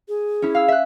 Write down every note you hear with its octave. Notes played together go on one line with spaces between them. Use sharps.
G#4
C#4 E4
F5 E6
E5 F#6